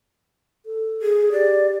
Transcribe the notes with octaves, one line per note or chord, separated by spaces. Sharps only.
A4
G#4
G4 D5